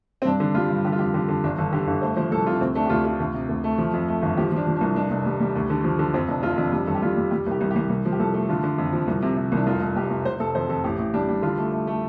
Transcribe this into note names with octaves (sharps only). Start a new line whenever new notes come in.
C4
G2 D4
D3
G3 F4
G2
D3 G4
F4
F2 G4
D3 G4
D3
G1 D4
G1 A4
D3 G4
G1 A4
A3 C5
F3 C5
C2 A4
C3 F4
D2 C4
A3 D4
G4
D2 F4
A3 F4
D2
C3
D2
A3
F3
F2
A3
G1
F3 G4
F3 D4
F3
D4
C2
F1 D4
F1
G3
G3
D2
D3
F3
D3
F2 C4
F1 D4
F1 F4
F2 D4
G3 D4
G1 A4
G4
G3 F4
G3
G3 G4
C2 G4
C2
G4
C2
C2
F3
G4
C2 A4
A3
D3 F4
D3
F2
F3
C2
C3
C3
C2 D4
F1 F4
F1
F1 G4
F1
F1 C5
F1 A4
F2 C5
F2 A4
A1 G4
A1
G3 D4
G3
D3 F4
A3
A3
A3